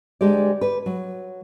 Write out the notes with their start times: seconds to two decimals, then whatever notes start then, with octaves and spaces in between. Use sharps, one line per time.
0.21 D2 G#3 G4 D5
0.61 B4
0.86 F#3